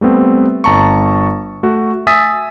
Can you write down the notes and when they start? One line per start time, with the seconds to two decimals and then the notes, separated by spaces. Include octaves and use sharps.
0.01 G3 A3 B3 C4
0.64 G1 A5 A#5 C#6
1.63 A3 F#4
2.07 E5 G#5 D#6 E6 A6 B6